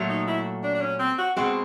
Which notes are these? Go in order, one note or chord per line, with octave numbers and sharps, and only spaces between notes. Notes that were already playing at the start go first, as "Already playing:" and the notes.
Already playing: A#2 F#3 A3
D#4
E4
D4
D4
C#4
C4
F#4
B2 G#3 C4 F#4